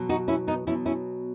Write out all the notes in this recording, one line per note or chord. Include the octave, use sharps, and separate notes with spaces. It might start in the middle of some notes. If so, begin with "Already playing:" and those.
Already playing: B2 F#3
D#4 F#4
C#4 E4
B3 D#4
B2 F#3 C#4 E4
C#4 E4